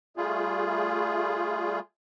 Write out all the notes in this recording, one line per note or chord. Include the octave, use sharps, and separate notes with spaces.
G3 A3 F4 G#4